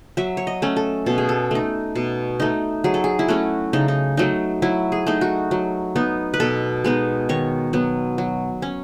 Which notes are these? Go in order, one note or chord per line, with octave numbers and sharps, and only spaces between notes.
F#3 E5
C#5
D#5
A3 C#4
A4
B2 A4
G#4
A4
A3 D#4
B2
A3 D#4
F#3 G#4
A4
G#4
E4
A3 C#4 F#4
C#3 D#4
D#4
F#3 A3 D#4
F#3 E4
G#4
A3 D#4
F#4
F#3
B3 D#4
B4
B2 A4
G#3 B3 D#4
D#3 C#5
F#3 B3
F#3
C#4